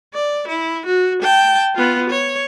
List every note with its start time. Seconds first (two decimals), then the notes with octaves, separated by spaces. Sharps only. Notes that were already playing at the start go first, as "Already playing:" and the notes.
0.14 D5
0.48 E4
0.86 F#4
1.22 G5 A5
1.75 B3 F4
2.09 C#5